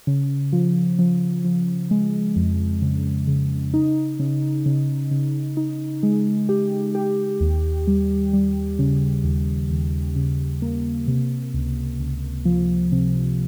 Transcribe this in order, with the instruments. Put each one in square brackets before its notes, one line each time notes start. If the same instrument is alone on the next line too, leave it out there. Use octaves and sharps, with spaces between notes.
[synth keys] C#3
F3
F3
F3
G#3
F2
C#3
C#3
D#4
C#3
C#3
C#3
D#4
G#3
G4
G4
D#2
G3
G3
C#3
D#2
D#2
C#3
A#3
C3
C#2
C#2
F3
C3